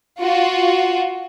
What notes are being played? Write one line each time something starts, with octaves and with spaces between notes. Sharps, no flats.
F4 F#4